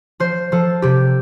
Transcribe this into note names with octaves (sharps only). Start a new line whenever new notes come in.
F3 C5
F3 A4
C3 G4